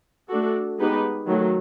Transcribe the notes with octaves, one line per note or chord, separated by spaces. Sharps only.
A3 D4 F#4 A4
G#3 B3 D#4 G4 B4
D#3 F#3 A3